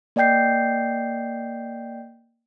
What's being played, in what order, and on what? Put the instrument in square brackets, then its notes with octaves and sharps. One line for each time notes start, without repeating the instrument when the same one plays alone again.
[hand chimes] A#3 D5 D#5 G5 G6 C7